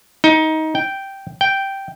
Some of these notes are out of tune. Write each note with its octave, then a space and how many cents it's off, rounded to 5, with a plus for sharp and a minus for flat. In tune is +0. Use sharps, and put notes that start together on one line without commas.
D#4 +20
G5 -5
G5 -5